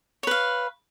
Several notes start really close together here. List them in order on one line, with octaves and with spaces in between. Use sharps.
C#5 B4 F5